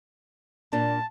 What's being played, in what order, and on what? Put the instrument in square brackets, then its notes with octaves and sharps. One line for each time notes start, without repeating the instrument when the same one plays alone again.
[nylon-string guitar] A#2 A#3 D4 [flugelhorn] A5